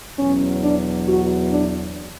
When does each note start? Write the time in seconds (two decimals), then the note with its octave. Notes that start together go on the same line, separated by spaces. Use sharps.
0.17 E2 B2 F#3 C#4
0.61 D4
1.07 F#4
1.50 D4